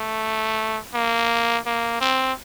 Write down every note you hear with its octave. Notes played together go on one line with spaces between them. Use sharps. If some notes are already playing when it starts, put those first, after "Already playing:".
Already playing: A3
A#3
A#3
C4